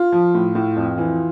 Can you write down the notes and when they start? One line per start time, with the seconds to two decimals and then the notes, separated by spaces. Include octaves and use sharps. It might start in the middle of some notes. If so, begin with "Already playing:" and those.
Already playing: F4
0.12 F3
0.34 A2
0.55 A2
0.76 F2
0.98 E3